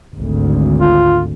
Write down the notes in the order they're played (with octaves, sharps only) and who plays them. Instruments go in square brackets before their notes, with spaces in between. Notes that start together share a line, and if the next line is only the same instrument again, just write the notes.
[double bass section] G#1 D2
[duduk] F4